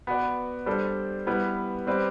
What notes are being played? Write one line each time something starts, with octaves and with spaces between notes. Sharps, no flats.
B3 F#4 B4 D5
G3 D4 A4 C5
G3 B3 E4 B4
G3 C4 G4 B4 D5